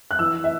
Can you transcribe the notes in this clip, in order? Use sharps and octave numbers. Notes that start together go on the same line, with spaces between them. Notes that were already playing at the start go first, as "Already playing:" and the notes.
F#6
E3 E6
E5